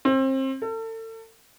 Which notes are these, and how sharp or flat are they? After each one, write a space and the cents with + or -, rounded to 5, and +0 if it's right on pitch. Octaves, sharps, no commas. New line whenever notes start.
C4 +30
A4 +35